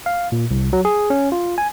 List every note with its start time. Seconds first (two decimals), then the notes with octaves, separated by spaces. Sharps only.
0.06 F5
0.32 A#2
0.51 C2
0.73 F#3
0.85 G#4
1.10 C#4
1.32 F4
1.58 G#5